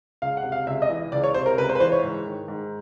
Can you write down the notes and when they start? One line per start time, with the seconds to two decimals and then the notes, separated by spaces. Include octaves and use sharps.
0.22 C#2 F5
0.37 F#5
0.43 C3
0.52 F5
0.67 C#2 E5
0.82 D#5
0.90 E3
1.12 C#2 D5
1.24 C#5
1.34 C3 C5
1.46 A#4
1.57 C#2 B4
1.69 C5
1.75 B4
1.80 E3 C5
1.92 C#5
2.03 G#2
2.26 D#3
2.48 G#2